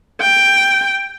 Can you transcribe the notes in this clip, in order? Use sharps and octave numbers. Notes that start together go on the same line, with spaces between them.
G5